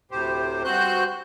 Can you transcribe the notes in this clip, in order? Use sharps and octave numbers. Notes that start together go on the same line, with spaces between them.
D2 A2 C3 G4 C5
G2 C4 F#4 C5 F#6 G6